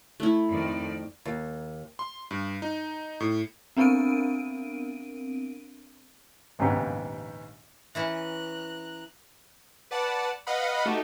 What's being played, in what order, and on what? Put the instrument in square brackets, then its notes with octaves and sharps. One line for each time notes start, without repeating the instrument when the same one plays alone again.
[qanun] A3 E4
[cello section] F2 D#3 D5
[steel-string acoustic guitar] D#2
[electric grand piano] C6
G2
D#4
A2
[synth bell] B3 C4 D4 A#4 D7 D#7
[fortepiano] A#1 D#2 G#2 C#3 B3 G4
[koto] E3 C#4 E4 [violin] A#5 F#6
[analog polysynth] B4 D5 F#5 A5
B4 D#5 F5 F#5 B5
A3 D#4 F#4 G4